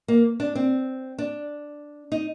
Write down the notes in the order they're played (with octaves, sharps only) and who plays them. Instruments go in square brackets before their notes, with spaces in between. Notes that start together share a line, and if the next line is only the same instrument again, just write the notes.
[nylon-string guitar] A#3
D4
C4
D4
D#4